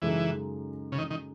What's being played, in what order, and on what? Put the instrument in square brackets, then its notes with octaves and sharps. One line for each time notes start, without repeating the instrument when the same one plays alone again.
[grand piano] F#2 C#3 G#3 D#4 A4 [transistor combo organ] E3
[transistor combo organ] C#3
D#3
D#3